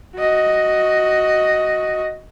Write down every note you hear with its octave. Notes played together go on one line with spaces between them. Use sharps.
F#4 D#5